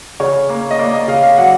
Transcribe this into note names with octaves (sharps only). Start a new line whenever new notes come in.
C#3 C#5
A#3
D#5
A#3 D5
D#5
C#3 F5
F5
F#3 F#5